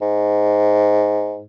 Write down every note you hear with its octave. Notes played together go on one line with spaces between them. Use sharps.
G#2